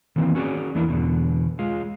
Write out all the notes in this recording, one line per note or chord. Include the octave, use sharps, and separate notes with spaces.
D#3 E3 A#3 C4
C#4 F#4 G#4 A4 C#5 D5
E2 E3 A#3 D4 E4 A#4
E2 B2 D3
G#3 F4